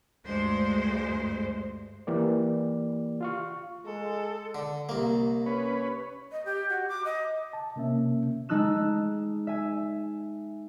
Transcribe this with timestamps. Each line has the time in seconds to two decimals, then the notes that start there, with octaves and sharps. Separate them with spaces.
0.25 D2 G2 G#3 C5
2.07 E3 A#3 G4 D5
3.21 F4 F5 C#6
3.86 G#3 A4
4.55 D3
4.89 C2 A#3
5.46 C#4 B4
6.32 D#5
6.45 G4
6.70 F#4
6.88 D6
7.05 D#5
7.53 A5
7.76 C3 A#3 C#4 E5
8.49 G#3 D#4 A4 E6 F#6 E7
9.47 E5 G#5